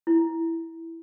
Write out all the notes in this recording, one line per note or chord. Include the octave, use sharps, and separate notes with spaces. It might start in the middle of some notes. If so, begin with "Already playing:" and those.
E4